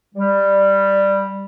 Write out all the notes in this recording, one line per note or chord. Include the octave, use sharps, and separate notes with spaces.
G3